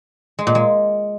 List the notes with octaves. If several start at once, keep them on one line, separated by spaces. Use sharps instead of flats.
G#3
A#2
G#3